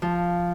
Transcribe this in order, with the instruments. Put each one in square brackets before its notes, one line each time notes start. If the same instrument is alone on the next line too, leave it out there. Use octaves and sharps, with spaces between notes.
[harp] F3